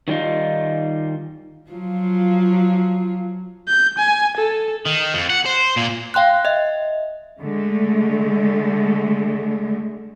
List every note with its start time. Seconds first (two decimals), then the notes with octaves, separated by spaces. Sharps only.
0.08 D#3 F#3 G3 D#4 F4
1.71 F3 F#3 F4
3.68 G6
3.98 G#5
4.37 A4
4.85 D#3
5.14 F2
5.30 F#5
5.46 C5
5.77 A#2
6.14 F5 G5 C6 F#6
6.45 D#5 E5
7.39 D3 G#3 A3